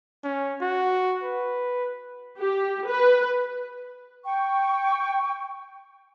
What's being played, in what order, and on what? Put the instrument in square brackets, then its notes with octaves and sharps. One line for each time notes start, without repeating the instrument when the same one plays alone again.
[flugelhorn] C#4
F#4
B4
[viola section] G4
B4
[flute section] G5 C#6